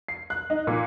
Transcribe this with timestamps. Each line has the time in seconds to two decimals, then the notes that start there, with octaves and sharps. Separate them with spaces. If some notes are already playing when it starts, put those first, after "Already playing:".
0.08 C7
0.30 F#6
0.50 D#4
0.67 A#2